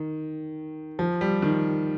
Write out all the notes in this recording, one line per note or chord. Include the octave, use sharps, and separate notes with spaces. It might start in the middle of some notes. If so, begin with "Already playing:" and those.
Already playing: D#3
F3
G3
D#3